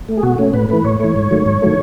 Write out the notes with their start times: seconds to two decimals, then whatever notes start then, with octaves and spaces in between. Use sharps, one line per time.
0.09 A3
0.17 G#4
0.23 B2 F#4
0.38 A3 C#4
0.53 A2 B4
0.69 E3 A3 B4
0.84 A2 C#5
1.00 E3 A3 C#5
1.16 G#2
1.31 D#3 F#3 A3
1.46 G#2
1.62 D#3 F#3 A3